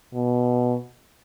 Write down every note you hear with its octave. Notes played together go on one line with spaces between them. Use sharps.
B2